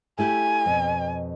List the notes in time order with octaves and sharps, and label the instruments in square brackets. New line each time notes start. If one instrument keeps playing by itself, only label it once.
[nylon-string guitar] A3 E4 G4 [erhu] G#5
[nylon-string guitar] F2 B2